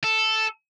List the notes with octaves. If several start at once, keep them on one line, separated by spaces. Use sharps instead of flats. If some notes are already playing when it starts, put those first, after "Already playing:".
A4